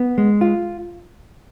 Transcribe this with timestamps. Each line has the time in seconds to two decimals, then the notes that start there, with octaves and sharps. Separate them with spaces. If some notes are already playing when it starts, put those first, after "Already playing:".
Already playing: B3
0.18 G#3
0.41 F4